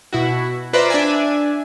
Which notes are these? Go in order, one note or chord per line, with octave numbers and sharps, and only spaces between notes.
B2 E4 F#4
F4 B4 C5 D5 E5 A#5
D4 E5 G#5